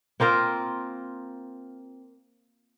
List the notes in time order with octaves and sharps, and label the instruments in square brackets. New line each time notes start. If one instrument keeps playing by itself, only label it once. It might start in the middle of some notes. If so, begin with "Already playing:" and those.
[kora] A#3 C4 F4 A#4